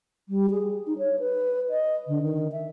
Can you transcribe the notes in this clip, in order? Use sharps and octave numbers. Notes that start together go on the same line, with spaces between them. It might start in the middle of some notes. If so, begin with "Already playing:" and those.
G3
G#4
D#4
C#5
B4
D#5
D3
D#3
E5